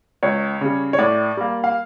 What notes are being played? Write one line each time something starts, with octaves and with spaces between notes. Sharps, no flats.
C#2 C#5
C#3 G3
C#5
A2 D5
G3 A#3
F5